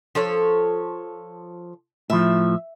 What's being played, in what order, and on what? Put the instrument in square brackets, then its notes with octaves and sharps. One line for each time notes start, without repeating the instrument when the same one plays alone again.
[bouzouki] F3 A4 C#5
[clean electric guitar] A2 F3 [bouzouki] E5